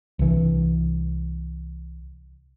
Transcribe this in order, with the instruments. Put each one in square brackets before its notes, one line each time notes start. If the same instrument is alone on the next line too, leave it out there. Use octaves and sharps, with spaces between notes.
[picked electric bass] C2 E3